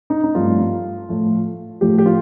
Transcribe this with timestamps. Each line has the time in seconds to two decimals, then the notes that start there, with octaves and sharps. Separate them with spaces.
0.10 D#4
0.24 D#4
0.35 G2 F3 A3 C4 F4
1.08 A2 F3 A3
1.81 A2 F3 A3 G4
1.98 G4
2.06 F4